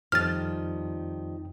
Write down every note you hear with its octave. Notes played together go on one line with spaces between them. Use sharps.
F2 D#3 F3 G3 F6 A6